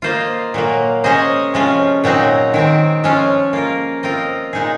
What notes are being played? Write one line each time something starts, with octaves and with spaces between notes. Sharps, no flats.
A#3 F4 C5 D#5
A#2 F#3 A#3
G#3 C#4 G#4 C5 D#5
C3 F3 G#3 C#4 F4
A#2 F#3 C4 D#4 G#4
D#3 G#3 C4
F3 G#3 C#4 F4
A#3 F4 A#4
C4 F4 A#4 D#5
A#2 G#3 D#4 G#4